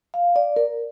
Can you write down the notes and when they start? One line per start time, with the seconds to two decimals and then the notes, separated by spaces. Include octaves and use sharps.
0.14 F5
0.36 D5
0.56 A#4